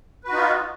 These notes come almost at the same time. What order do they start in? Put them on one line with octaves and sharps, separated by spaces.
B4 F#4 D#4 F4